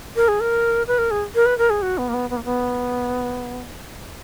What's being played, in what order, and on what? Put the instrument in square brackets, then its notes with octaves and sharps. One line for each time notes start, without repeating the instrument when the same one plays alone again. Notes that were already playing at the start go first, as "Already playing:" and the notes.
[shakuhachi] A#4
G#4
A#4
B4
A#4
G#4
A#4
B4
A#4
G#4
F#4
B3
A#3
B3
B3
A#3
B3